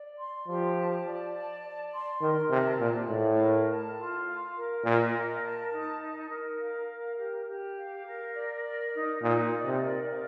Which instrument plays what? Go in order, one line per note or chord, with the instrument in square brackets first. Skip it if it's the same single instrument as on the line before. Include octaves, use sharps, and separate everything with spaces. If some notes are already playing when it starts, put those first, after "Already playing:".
Already playing: [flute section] D5
C6
[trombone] F3 [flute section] G4
[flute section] A5
D5
A5
D5
C6
[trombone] D#3 [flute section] A#4
[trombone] C3 [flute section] A5
[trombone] A#2 [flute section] D5
[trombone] A2 [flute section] F5
[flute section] A#4
A5
F4
F5
A#4
[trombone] A#2 [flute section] D#5
[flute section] A#4
A5
D#4
D#5
A#4
F5
A#4
G4
G4
F5
A#4
D5
A#4
D#4
[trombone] A#2 [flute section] D#4
[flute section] D5
[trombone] C3
[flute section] A#4
F5